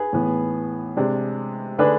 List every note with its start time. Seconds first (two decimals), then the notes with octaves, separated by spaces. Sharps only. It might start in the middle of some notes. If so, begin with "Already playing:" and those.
Already playing: G#4 B4
0.13 A2 E3 B3
0.97 C3 G#3 D4
1.78 D3 A3 D4 G#4 B4